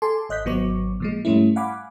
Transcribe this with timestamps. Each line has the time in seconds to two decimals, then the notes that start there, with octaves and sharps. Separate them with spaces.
0.02 A4 G#5 A5 C6 D6
0.29 G#1 D#5 F#6 G6 B6
0.45 G#1 F#3 B3 C#6 D6
1.00 A#2 F3 G#3
1.25 G#2 G3 A3 C#4 E4
1.56 F5 F#5 G#5 B5 D6